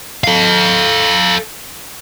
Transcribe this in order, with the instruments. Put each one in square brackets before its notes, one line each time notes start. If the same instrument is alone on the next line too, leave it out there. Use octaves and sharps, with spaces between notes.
[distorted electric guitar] A4 F5